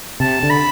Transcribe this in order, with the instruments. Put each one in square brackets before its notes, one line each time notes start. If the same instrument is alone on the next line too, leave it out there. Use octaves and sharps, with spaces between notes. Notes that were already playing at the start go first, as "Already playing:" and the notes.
[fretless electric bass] C3 [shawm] A5
[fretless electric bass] D3
[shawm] B5